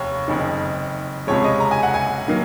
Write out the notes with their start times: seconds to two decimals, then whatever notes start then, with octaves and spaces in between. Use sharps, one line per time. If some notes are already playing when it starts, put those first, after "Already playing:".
Already playing: F1 D#2 C#5
0.28 F#1 F2 D#3
1.27 C#2 C3 F3 G#3 C#5
1.44 D#5
1.60 A#5
1.71 G#5
1.83 F#5
1.94 G#5
2.28 D#3 F#3 A#3